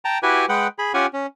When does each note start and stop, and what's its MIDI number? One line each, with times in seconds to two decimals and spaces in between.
0.05 0.18 79
0.05 0.18 81
0.05 0.18 82
0.23 0.46 64
0.23 0.46 66
0.23 0.46 67
0.23 0.46 71
0.23 0.46 80
0.49 0.67 56
0.49 0.67 71
0.49 0.67 78
0.49 0.67 79
0.79 0.92 68
0.79 0.92 83
0.94 1.06 61
0.94 1.06 65
0.94 1.06 67
0.94 1.06 78
0.94 1.06 80
1.13 1.26 61